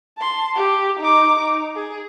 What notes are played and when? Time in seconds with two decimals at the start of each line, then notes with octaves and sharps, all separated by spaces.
0.18 A5 C6
0.56 G4
0.99 D#4 D6
1.39 D#4
1.76 G#4